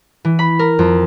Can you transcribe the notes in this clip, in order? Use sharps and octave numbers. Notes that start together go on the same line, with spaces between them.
E3
B5
A#4
F2